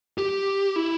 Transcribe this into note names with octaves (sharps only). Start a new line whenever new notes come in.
G4
E4